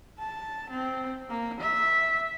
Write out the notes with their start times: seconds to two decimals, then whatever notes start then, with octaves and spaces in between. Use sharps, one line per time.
0.19 A5
0.70 C4
1.30 A#3
1.60 E5